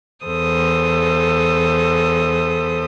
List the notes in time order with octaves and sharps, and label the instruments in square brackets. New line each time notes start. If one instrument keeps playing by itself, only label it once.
[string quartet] E2 A4 C5 D#6